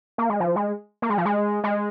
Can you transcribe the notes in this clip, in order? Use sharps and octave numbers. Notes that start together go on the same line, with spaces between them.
A#3
G#3
F3
G#3
A#3
G#3
F3
G#3
G#3